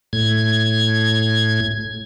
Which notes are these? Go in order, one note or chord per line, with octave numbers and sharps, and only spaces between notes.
A2 G#6